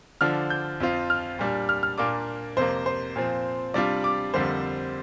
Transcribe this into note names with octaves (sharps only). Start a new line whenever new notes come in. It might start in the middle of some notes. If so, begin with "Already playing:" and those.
D3 F3 D4 F6
G6
F2 F3 C4 F4
F6
A#2 G3 D4
F6
F6
A#2 A#3 D4 D6
F2 C3 A#3 C5
C5
A#2 F3 C4
C3 G3 D4 F4 D5
D6
F2 D3 G3 A#3 C5